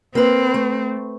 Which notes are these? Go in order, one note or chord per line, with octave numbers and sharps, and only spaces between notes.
A#3 C4 B4
A3